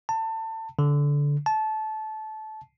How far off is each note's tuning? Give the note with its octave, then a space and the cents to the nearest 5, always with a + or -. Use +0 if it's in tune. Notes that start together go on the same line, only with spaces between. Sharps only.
A5 +25
D3 -20
A5 -20